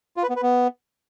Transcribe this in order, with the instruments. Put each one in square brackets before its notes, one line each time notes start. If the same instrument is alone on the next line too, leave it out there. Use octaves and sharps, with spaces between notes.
[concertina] F4
B4
B3
B4
B3